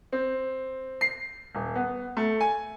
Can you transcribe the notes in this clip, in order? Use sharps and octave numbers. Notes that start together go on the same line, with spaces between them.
C4
C7
D#1
B3
A3
G#5